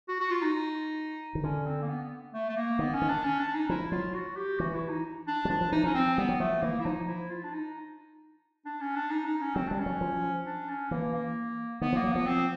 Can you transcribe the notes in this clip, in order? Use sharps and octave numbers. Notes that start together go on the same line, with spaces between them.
F#4
F#4
F4
D#4
D#3
D3 C#4
C4
A#3
B3
B3
A3
A3
A#3
D#3 B3
C#4
D#3
D4
C#4
D4
D#4
F3 E4
F#3 F4
F#4
G4
E3 F#4
E4
D#4
D4
F#3
F3 D4
F3
E3 D#4
F3 C#4
C4
G3 B3
F#3
F3 A3
E3 A#3
E4
F3 D#4
E4
F4
D4
D#4
D4
C#4
D4
D#4
D#4
C#4
F#3 C4
G3 D4
C#4
F#3
F3
D4
C#4
E3 A#3
A#3
D#3 B3
F3
A#3
F#3
F3 B3
C4